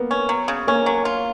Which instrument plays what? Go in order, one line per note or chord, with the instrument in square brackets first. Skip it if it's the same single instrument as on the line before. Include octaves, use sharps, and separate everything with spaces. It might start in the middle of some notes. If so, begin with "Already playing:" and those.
Already playing: [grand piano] A#3 B3
[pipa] C#4
F#3
C#3
[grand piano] A#3 [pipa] C#4
[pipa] F#3
F4